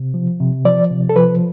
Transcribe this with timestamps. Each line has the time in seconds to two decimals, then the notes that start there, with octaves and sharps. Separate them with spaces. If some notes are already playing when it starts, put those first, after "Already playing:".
Already playing: C3
0.14 F3
0.40 C3
0.65 F3 D5
0.91 C3
1.09 A4
1.16 F3 B4